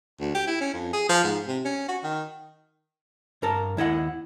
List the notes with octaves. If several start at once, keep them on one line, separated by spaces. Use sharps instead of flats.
D2
G4
E4
C#4
F2
G#4
F3
G#2
C3
C#4
F#4
D#3
G2 A#4 A5
D#2 E4 D#5 F#5